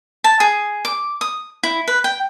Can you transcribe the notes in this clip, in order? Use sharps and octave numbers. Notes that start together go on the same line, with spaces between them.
A5
G#4
D6
D#6
E4
B4
G5